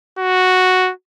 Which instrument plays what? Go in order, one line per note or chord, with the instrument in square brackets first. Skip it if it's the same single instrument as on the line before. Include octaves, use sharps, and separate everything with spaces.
[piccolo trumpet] F#4